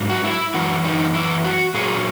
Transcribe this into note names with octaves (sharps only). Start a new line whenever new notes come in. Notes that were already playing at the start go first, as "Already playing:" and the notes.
Already playing: G#2 F#3
F#4
E4
F#2 E3 F#4
D#4
E4
F#4
A#2 F#3 G#4